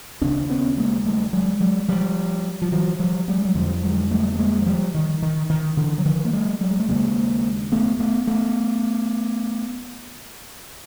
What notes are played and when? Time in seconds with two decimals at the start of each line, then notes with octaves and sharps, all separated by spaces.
0.21 D#2 C#3 C4 D4
0.49 B3 C#4
0.78 G#3 A#3
1.05 G3 A3
1.33 F#3 G#3
1.60 F#3 G#3
1.88 F3 G3
2.62 F3
2.72 E3 F#3
2.99 F3 G3
3.28 F#3 G#3
3.45 F#3
3.55 F2 D3 F3 G3
3.83 F#3 G#3
4.11 G3 A3
4.34 A3
4.39 G#3 A#3
4.62 F#3
4.66 F3 G3
4.95 D#3
5.22 D#3
5.50 D#3
5.77 D3 E3
5.98 F#3
6.05 D#3 F3
6.25 A#3
6.33 G3 A3
6.61 F#3 G#3
6.71 G#3
6.80 A3
6.88 D#2 C#3 G#3 A#3
7.72 A3 B3
8.00 A3 B3
8.27 A3 B3